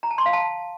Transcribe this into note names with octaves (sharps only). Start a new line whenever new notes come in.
A#5
A5
C6
F5
A5